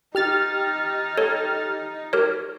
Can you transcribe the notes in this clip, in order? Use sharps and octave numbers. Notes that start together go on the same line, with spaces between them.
D#4 G4 F6 A6
A4 C#5
G4 A#4 C#5